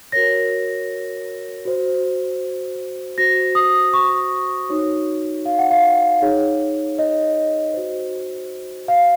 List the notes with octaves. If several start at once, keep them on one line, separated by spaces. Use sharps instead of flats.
F#4 A#4 C#5 A#6
F#4 C5
F#4 C5 A#6
D#6
C#6
D#4 F#4 C#5
F5
F#5
F5
D#4 G#4 C#5
D#5
F#4 C5
F5